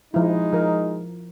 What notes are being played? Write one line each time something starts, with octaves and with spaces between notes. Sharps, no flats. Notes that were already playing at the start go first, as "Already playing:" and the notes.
F3 G#3 D#4 E4
F3 A#4